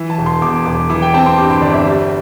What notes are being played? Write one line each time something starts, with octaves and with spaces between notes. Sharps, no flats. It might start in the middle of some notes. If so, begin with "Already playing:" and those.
Already playing: E3
A5
E1
C6
E2 D6
E1 D6
E3 D6
G5
C4 A5
C6
G2 D6
C6
G1 D5
E5
G3